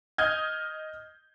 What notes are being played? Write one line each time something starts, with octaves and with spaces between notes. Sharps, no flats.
D#5 D#6 F6 G6 G#6